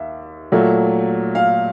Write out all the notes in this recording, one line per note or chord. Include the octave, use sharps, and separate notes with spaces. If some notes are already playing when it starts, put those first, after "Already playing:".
Already playing: D#2 E5
A#2 F#3 A3
F5